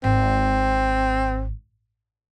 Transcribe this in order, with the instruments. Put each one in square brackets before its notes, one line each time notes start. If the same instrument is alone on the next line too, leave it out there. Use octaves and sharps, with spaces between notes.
[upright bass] G#1 [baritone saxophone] C4